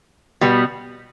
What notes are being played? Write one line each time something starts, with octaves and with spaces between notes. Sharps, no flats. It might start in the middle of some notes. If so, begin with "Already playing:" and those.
B2 G3 B3